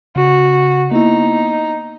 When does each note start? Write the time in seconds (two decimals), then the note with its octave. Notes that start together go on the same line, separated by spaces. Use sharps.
0.16 C#3 F#4
0.91 A#3 B3 D#4 E4